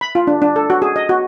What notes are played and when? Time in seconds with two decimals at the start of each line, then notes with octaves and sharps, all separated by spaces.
0.01 B5
0.15 F4
0.27 D4
0.42 D4
0.56 A4
0.70 F#4
0.82 G#4
0.96 D#5
1.09 F#4